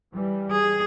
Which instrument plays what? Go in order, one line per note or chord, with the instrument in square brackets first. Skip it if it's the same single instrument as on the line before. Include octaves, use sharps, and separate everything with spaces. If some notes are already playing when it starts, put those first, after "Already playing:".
[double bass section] E3 G3
[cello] G#4